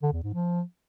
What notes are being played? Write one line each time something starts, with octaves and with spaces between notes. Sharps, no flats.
D3
E2
G#2
F3